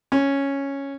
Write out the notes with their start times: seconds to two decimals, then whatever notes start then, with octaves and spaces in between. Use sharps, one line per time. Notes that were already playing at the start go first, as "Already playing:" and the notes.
0.12 C#4